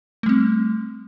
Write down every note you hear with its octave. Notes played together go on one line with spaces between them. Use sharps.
G3 A3 C4